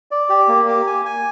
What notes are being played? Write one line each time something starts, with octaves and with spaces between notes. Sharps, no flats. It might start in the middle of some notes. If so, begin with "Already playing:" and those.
D5
G4
A#3
G4
G#5
G#5